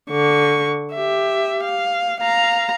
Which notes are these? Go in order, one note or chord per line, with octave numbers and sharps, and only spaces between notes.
D3 C#6
G4 E5
F5
F5 A#5